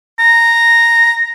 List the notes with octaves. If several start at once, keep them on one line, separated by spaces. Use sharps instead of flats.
A#5